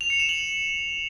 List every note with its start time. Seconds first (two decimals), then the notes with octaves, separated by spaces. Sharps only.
0.01 F7
0.10 C#7
0.20 E7
0.29 F#7